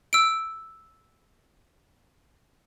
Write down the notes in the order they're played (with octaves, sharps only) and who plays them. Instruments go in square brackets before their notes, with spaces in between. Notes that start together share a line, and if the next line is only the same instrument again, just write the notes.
[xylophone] E6 D7